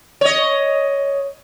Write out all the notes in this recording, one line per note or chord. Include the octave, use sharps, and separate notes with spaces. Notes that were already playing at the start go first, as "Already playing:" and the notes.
C#5 D#5